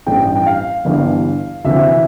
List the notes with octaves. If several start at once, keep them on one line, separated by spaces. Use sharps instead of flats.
A1 G2 E3 G5
G5
F5
G1 G2 E3
D2 C3 E3 E5